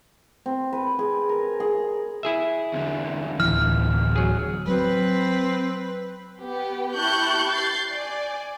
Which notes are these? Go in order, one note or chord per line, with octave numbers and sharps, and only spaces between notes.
C4
B4
G#4
A#4
G#4
E4 G#4 E5
E2 D3
D1 E3 F6
F#3 G#4
F#3 C4 B4
B3 G4
E4 G4 A5 C#6 F#6 G6
G6 A6 C7
D5 G#5